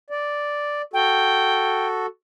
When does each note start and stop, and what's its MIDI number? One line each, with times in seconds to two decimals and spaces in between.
0.10 0.82 74
0.93 2.06 66
0.93 2.06 69
0.93 1.88 79